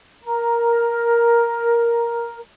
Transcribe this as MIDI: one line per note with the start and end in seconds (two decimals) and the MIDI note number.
0.23 2.37 70
0.23 2.37 82